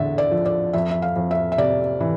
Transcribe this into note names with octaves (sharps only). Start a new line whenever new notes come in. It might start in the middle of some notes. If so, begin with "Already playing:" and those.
Already playing: E2 D3 A4 E5
D5
F3
D5
F2 E5
E5
F5
F2
E5
E5
C3 D5
E3